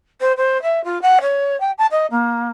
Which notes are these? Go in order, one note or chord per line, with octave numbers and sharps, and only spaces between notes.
C5
C5
E5
F4
F#5
C#5
G5
A5
D#5
A#3